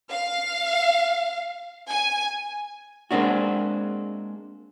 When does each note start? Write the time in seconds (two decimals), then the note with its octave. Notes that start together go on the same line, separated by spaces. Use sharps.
0.11 F5
1.89 G#5
3.11 G#3 A#3 C4 D4 F#4